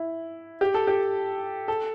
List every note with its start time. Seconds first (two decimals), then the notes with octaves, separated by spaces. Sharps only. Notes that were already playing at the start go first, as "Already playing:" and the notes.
Already playing: E4
0.61 G4
0.74 A4
0.87 G4
1.68 A4